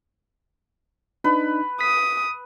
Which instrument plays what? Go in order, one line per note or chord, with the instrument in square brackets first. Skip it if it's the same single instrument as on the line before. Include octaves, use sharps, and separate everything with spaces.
[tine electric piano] D4 D#4 [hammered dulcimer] B4
[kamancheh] D#6 [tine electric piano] B6